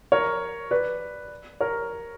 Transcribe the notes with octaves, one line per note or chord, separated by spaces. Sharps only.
A#4 C#5
B4 D5
A#4 C#5